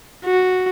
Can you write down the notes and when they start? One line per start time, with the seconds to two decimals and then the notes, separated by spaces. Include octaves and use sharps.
0.25 F#4